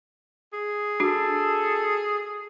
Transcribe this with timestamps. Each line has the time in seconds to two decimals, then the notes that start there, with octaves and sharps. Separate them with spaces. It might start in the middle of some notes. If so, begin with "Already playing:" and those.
0.53 G#4
1.00 D4 F#4 A4